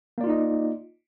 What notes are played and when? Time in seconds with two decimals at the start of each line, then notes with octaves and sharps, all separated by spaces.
0.18 A#3
0.21 D5
0.24 F4
0.27 D#4
0.30 D#5